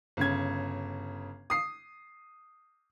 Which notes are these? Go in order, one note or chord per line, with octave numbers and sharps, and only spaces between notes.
G1 C#3 G#6
D#6 C7